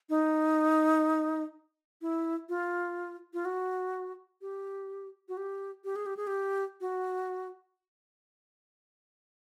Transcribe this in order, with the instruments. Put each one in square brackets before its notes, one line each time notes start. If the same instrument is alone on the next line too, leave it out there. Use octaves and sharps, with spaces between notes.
[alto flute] D#4
E4
F4
F4
F#4
G4
F#4
G4
G4
G#4
G4
G#4
G4
F#4